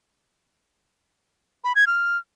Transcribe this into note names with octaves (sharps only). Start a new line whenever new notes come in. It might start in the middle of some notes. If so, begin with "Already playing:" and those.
B5
G#6
F6